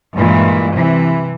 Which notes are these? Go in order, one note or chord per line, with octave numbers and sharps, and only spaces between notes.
G2 A#2 E3 G#3
C3 E3